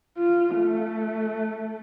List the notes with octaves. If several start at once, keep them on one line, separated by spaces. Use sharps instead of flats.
F4
A3